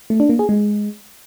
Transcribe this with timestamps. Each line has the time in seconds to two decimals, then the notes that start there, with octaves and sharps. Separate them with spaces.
0.10 A3
0.20 D4
0.30 A#3
0.39 G#4
0.49 G#3